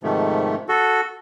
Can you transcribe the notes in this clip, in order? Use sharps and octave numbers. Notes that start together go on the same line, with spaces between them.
G#2 C3 D#3 F3 A3
F#4 A4